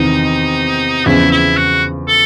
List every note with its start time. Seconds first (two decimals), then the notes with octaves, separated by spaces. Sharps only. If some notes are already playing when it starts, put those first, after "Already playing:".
Already playing: E2 C3 D#3 D#4
1.05 E2 C#3 F3 E4
1.31 E4
1.57 F#4
2.08 A4